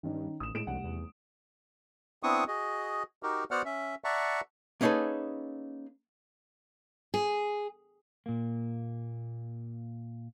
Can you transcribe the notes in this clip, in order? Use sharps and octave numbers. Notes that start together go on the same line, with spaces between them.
G2 D#3 C#4 D#4
A1 D#6 E7
A2 G#3 D7 E7
F1 C2 G3 F#5
E2
B3 C4 D4 E4 C#6 D#6
F#4 G#4 D#5
D#4 F#4 G4 A#4
B3 F#4 C5 D5 F#5 F6
C#4 E5
D5 E5 F#5 A5 A#5 C#6
A#3 C#4 D#4 G#4 A4 B4
G#4
A#2 A#3